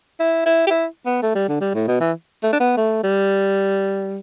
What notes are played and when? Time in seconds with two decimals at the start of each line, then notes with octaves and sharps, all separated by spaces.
0.20 E4
0.45 E4
0.67 G4
0.70 E4
1.06 B3
1.22 A3
1.35 G3
1.48 D3
1.61 G3
1.74 A2
1.88 B2
2.00 E3
2.43 A3
2.53 D4
2.60 B3
2.77 A3
3.03 G3